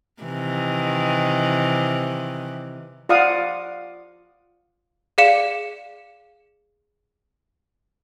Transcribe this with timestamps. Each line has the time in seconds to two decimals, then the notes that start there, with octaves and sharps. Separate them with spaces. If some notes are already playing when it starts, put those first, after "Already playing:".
0.22 C3 D#3 E3
3.09 F4 D5 F5 F#5 D#6
5.18 G#4 D5 F5 C#7 E7